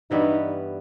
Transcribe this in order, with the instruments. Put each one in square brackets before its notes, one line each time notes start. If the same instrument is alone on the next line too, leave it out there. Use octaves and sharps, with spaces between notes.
[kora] G2 E3 G3 B3 [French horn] D#4